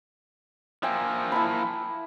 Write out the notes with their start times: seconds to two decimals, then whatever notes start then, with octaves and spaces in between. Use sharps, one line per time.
0.83 F3 A#3 E5 G5 G#5
1.32 E4 A5 B5